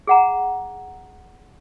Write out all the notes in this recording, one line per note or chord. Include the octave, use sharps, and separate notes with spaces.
G#4 F#5 A#5